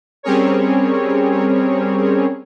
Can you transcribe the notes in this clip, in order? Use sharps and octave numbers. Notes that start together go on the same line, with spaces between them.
G3 C4 C#4 G#4 A#4 C#5